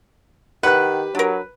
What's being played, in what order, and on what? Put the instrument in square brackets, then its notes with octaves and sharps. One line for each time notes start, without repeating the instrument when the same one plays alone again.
[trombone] D#3 [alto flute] G4 [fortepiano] B4 F#6 [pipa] F#5
[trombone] F#3 [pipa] D4 A#4